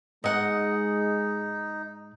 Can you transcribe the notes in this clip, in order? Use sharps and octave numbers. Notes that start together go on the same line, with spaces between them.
G#2 G#3 D#4 D#5 F#5